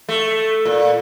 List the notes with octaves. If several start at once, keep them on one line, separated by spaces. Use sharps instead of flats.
A3
A#2